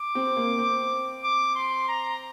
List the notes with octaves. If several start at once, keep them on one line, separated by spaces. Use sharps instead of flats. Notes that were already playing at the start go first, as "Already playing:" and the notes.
Already playing: D6
C4
A#3
C4
D6
C6
A#5